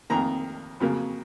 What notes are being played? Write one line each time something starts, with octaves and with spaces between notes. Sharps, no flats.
F2 D#3 A#3 A#5
F2 C#3 F#3 A#3